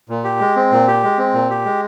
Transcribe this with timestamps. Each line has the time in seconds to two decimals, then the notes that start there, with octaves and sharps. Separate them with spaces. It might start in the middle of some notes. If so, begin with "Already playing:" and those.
0.09 A#2
0.24 G4
0.41 G#3
0.56 C4
0.72 A#2
0.88 G4
1.03 G#3
1.18 C4
1.34 A#2
1.50 G4
1.66 G#3